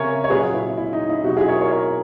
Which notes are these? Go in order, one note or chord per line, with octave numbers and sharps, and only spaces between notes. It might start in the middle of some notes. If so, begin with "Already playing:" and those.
Already playing: C#3 A#4 C#5 E5 G#5 A#5
C#5
A#2 F#3 G#4 B4
E4
E4
D#4
E4
B2 F#3 D#4 F#4
E4 G#4
A#4 C#5
A#4 C#5
A#4 C#5